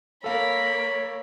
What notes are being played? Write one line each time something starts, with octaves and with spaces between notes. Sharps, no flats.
A#3 A4 A#4 C#5 F5 B5